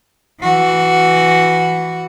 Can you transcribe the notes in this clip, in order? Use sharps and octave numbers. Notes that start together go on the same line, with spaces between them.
E3 F#4